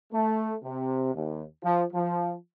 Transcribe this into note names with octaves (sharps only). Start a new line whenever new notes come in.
A3
C3
D#2
F3
F3